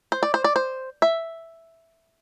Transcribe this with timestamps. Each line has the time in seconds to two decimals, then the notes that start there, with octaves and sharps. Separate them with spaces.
0.12 C5
0.23 D5
0.34 C5
0.44 D5
0.56 C5
1.02 E5